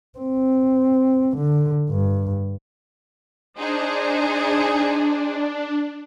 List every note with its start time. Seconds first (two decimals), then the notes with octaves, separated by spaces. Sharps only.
0.18 C4
1.37 D3
1.90 G2
3.58 D4 D#4 G#4 C5